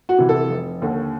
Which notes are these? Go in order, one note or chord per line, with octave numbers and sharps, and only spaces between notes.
F#4
C3 E3
A4
F1
D#2 D3